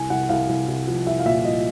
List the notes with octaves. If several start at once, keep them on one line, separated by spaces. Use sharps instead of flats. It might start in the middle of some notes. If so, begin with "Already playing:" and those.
Already playing: C2 G#5
C2 F#5
C2 F5
C2
C2
F3
C2 E5
F5
A#2 E5
C2 D#5